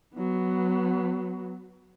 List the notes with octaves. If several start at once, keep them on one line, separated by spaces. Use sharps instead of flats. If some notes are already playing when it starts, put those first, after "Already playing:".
F#3 B3